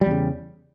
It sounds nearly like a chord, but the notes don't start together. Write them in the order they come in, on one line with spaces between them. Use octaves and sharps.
G3 E2 C#3